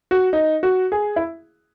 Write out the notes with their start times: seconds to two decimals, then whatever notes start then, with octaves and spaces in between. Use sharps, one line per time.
0.11 F#4
0.33 D#4
0.63 F#4
0.92 G#4
1.16 E4